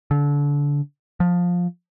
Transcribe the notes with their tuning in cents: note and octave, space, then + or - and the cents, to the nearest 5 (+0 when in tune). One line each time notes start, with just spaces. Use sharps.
D3 -30
F3 +15